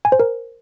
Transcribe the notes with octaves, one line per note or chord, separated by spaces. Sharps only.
G#5
C5
A#4